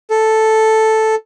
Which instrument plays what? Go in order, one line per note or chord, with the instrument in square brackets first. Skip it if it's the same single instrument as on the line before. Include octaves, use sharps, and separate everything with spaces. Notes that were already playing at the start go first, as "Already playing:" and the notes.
[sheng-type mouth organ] A4